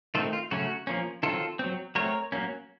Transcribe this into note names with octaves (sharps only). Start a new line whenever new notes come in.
D#3 A3 C4 F4 A4
F4
C#3 F#3 A3 C#4 F#4
F3 A#3 C#4
D#3 F#3 C4 F4 A4
F#3 C4
F#3 A3 C4 A#4 C#5
F#3 A#3 C#4